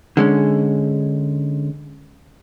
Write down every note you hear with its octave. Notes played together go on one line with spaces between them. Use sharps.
D3 G#3 C#4